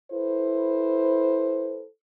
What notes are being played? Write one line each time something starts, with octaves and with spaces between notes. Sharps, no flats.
E4 A4 B4 C5